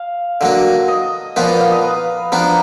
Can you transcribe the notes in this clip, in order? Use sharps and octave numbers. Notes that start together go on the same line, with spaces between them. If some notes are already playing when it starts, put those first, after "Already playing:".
Already playing: F5
D3 F#3 A#3
D#5
A#2 F3 B3 F4 B4
D5
F5
D#5
B4
F3 B3 D4 A#4